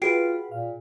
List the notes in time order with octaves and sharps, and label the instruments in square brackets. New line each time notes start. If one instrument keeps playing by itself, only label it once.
[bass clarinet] F4 [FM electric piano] F#4 B4 F#5 [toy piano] G#4 [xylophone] G5 C7 D7
[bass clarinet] A#2 [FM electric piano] F5